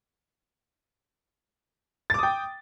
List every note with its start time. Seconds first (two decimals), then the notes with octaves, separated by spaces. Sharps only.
2.10 A6
2.14 D6
2.19 D#6
2.23 G5